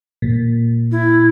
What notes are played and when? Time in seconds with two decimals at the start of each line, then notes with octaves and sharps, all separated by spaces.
0.22 A#2
0.92 E4